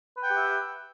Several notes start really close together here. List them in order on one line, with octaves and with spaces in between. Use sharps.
B4 G5 F#5 G4 E5